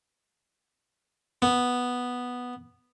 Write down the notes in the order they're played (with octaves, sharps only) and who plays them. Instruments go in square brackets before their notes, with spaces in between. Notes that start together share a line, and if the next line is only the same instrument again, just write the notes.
[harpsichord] B3